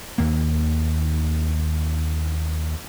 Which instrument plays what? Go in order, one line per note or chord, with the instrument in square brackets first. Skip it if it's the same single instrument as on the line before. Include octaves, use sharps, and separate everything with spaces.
[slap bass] D#2 A#3